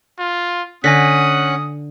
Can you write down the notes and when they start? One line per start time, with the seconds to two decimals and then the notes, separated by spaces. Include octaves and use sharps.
0.20 F4
0.84 D3 C#4 F#5 G#5 D#6 F#6 A#6 B6